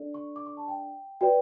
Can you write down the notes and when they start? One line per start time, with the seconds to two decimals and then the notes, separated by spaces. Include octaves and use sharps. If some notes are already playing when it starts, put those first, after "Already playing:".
Already playing: D4 A4 D5
0.14 C#6
0.36 D6
0.46 C#6
0.57 A5
0.68 G5
1.21 F#4 B4 D5 G5